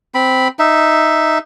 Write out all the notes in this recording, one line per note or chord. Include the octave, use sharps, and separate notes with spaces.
C4 B5
D#4 E5